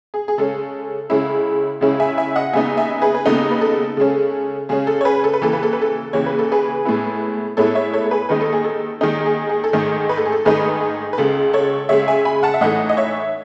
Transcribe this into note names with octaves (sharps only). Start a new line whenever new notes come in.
G#4
G#4
C#3 G#3 C#4 A4
C#2 C#3 G#3 C#4 E4
C#2 C#3 G#3 C#4 E4
E5 G#5
E5 G#5
D#5 F#5
D#2 C#3 G#3 B3 D#4 E5 G#5
E5 G#5
G#4 B4
B4
D#2 C#3 G#3 B3 D#4 A4
B4
A4
C#3 G#3 C#4
C#3 G#3 C#4 G#4
A4
C#5
G#4 B4
A4
B4
D#2 C#3 E3 A4
B4
A4
B4
A4
D#2 C#3 E3 C#5
B4
A4
G#4 B4
A2 G#3 B3 E4
A2 G#3 B3 E4 A4 C#5
C#5 E5
A4 C#5
A4
G#4 B4
D#2 D#3 G#3 D#4 B4
A4
G#4
A4
D#2 D#3 G#3 D#4 G#4
G#4
G#4
A4
G#2 D#3 A3 D#4 G#4
B4
A4
G#4
A4
G#2 D#3 A3 D#4 G#4 B4
G#4
B4
C#2 C#3 G#3 A4
A4 C#5
C#2 C#3 G#3 C#5 E5
E5 G#5
G#5 B5
F#5 A5
E5
A2 E3 A3 D#4 D#5 F#5
D#5
C#5 E5